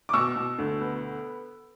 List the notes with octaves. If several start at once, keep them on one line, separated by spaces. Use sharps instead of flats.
D6
B2 C#6 E6
B2
D2
B3